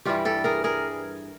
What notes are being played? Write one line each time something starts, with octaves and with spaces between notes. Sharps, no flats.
G2 E3 G3 F4 G4
G4 A4
G#4 A#4
G#4 A#4